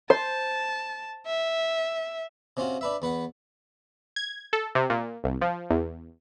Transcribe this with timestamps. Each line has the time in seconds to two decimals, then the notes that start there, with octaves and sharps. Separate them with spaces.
0.10 C5 A5
1.26 E5
2.57 C3 C#4 F4 F#4
2.81 D4 B4 E5
3.02 E2 B4 F#5
4.16 G#6
4.53 A4
4.75 C3
4.90 A#2
5.24 C2
5.41 F3
5.70 E2